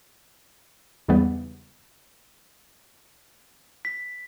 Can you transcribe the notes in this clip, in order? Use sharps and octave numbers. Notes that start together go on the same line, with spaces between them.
E2 G#2 C#3 E3 G3 B3
B6